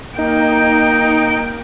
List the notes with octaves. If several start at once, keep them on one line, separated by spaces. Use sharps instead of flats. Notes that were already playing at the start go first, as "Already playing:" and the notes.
A#3 D#4 G5